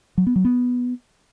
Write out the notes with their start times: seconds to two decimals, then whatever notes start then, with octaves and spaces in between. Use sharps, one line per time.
0.18 F#3
0.27 B3
0.36 F#3
0.45 B3